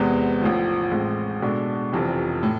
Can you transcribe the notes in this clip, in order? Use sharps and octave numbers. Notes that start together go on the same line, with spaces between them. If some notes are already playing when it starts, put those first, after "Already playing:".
Already playing: E2 C3 G#3 B3
A1 A2 F3
A1 A2 G#3 C4
B2 G#3 D4 A4
F1 F2 C3 E3
A2